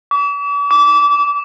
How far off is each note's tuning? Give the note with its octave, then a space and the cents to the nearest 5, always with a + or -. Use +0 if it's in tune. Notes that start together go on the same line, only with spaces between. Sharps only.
D6 -45
D6 -25